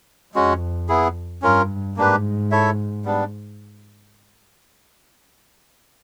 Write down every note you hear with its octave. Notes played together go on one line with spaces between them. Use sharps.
F2 G#3 C#4 F#4
B3 E4 G#4
G2 C#4 F4 A#4
G#2 A#3 D4 G4 B4
E4 A4 C#5 E5
G3 B3 D4